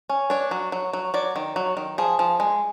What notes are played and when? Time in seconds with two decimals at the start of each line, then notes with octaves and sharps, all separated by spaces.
0.09 C#4
0.30 D4 C#5
0.51 F#3
0.72 F#3
0.93 F#3
1.14 F#3 D5
1.36 D#3
1.56 F#3
1.77 D#3
1.98 F3 G#4
2.19 F3
2.40 G#3